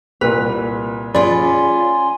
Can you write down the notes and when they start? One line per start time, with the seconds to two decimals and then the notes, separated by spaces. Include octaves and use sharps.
0.21 C2 A#2 B4
1.15 C#4 F4 G#4 D5 G#5 B5 C6